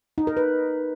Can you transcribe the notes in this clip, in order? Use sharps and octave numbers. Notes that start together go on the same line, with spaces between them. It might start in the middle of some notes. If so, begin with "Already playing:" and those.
D#4
A#4
B4